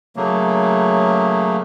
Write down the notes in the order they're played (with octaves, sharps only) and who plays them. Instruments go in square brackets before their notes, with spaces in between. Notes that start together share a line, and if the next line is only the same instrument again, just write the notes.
[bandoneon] C#3 F#3 A3 A#3